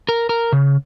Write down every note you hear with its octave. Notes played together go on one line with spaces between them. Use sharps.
A#4
A#4
C#3